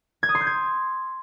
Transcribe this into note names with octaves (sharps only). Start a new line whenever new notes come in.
G#6
D#6
C6
G6
G#6